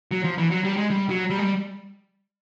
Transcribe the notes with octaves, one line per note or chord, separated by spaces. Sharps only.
F#3
F3
E3
F#3
G3
G#3
G3
F#3
G3
G#3
G3